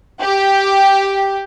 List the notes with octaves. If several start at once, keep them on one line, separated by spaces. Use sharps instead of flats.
G4